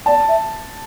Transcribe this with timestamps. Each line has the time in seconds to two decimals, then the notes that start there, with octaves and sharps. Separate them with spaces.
0.06 D5 A5
0.29 E5